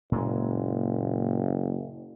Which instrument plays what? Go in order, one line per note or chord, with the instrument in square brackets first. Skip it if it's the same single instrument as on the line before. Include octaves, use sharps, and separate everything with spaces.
[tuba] F#1 [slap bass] A#2 G#3